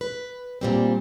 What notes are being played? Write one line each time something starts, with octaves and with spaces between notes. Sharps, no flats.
B4
A#2 G3 C4